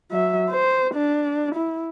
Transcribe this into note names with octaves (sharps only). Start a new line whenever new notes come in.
F#3 E5
C5
D4
E4